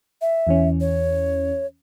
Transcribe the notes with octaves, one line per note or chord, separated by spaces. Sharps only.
E5
E2 E3 C#4
C#5